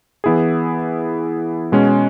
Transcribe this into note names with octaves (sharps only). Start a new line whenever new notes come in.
E3 B3 E4 G#4
B2 G#3 C#4